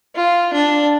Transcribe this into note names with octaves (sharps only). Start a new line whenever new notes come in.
F4
D4